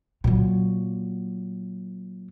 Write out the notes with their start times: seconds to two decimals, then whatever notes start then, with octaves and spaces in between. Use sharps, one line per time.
0.24 A#2 F#3